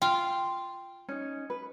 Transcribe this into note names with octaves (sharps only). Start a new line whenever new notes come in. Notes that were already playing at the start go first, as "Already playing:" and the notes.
F4 F5 G5
C#4 D#4
B4